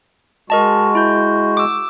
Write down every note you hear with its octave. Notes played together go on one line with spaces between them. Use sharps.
G#3 F#4 A#4 D#5 A5
E4 G6
D6 E6